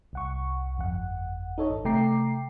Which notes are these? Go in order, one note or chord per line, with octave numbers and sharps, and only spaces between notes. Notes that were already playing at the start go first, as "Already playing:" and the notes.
C2 F#5 C#6
G1 F2 F#5
D#4 A4 C#5 D#5
G#1
C3 A3 G5 A#5 D6 C7